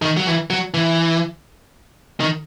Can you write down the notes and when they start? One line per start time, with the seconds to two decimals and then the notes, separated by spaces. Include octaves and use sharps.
0.02 D#3
0.17 F#3
0.27 E3
0.50 F#3
0.74 E3
2.20 D#3